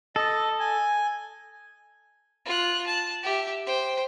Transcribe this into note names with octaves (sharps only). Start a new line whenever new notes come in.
A4 D#5
G#5
F4 F#6
A5
G4 E5
C5 G5